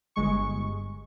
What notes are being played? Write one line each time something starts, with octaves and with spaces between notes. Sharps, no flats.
G1 G#3 C#6